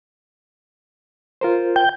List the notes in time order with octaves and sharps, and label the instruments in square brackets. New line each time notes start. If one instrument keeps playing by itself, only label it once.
[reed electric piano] F4 A#4 C5
[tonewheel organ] G5